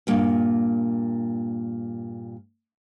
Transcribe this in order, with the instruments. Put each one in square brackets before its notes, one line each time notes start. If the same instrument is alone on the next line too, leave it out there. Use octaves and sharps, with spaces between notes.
[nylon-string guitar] G2 A#2 A#3